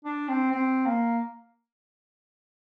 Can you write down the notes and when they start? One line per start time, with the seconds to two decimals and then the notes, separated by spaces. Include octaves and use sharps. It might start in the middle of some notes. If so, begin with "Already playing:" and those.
0.04 D4
0.28 C4
0.52 C4
0.86 A#3